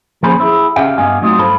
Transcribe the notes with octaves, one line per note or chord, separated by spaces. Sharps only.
F3 A#3 C#4 G#4 C5 B5
E4 G#4
C#3 C#4 G4 E5 F5 G5
G2 B3 G4 D#5 F5 G#5
F#3 G3 A3 C4 D#4 F4
G2 A4 C5 F5 A5 B5